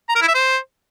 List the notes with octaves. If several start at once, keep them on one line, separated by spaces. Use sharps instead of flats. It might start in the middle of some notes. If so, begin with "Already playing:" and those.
A#5
A#4
E4
E5
C5